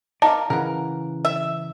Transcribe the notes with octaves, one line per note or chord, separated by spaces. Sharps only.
D#4 A#4 D5 F5 A5
C#3 E3 A#4 F#5
E5